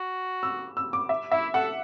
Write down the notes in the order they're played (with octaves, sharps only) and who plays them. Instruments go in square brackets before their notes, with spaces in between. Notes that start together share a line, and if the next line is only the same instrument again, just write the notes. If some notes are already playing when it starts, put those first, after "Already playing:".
Already playing: [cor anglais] F#4
[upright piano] E6
E6
D6
E5
[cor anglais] E4 [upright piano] E5
[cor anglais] A4 [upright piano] F#5